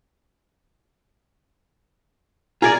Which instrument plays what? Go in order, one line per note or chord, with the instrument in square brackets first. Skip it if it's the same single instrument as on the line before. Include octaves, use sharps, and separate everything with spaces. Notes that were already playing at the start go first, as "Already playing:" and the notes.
[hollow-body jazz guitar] F4 G#4 D5 [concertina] G#5 A#5